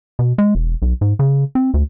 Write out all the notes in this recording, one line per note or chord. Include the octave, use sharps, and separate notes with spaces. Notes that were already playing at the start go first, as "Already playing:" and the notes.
B2
G#3
E1
B1
G#2
C#3
C4
D2